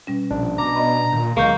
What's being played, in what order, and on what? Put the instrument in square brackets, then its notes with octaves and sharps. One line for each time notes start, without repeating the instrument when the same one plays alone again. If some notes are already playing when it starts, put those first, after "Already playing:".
[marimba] B2 G3 C#4
[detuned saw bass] A#1 [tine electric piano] D4
[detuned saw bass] B2 [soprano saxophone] A#5 [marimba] D6
[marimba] D5 D#5 B5
[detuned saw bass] A#2 [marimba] D#3
[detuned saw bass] C#2 [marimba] D3 F#3 G6 [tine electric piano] G#3 C#6 [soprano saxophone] A#3